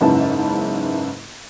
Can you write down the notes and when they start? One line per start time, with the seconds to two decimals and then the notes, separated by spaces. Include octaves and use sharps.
0.01 F#1 G#2 C#3 E4 B4 A5